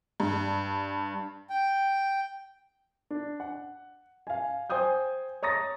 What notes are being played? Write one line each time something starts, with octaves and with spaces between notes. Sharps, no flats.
G2
G5
D4
F#5
F5 G#5
C5 G5 G#5 D#6 G6
C#5 A#5 D#6 A6 A#6